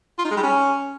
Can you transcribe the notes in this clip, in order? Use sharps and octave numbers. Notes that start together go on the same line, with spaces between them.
F4
D#4
G#3
G3
C#4